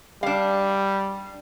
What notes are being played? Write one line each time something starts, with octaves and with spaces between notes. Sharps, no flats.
G3 D4 F5